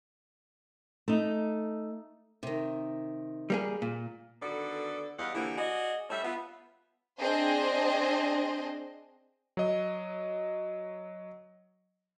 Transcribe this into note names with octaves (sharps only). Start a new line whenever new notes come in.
A3 D#4
C3 D#3
G3 A#3 G#4
A#2
D3 D#3 B3 F#4 A4 D5
E2 G3 D#5 F5 F#5
D3 E3 F3 A#3 E4 G4
F#4 G#4 D5 D#5
G3 A3 C#4 E5
B3 F4
C4 D4 G#4 C5 D#5
F#3 D#5